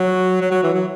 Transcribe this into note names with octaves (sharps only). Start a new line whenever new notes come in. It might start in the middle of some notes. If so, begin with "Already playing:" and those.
Already playing: F#3
F#3
F#3
E3
F#3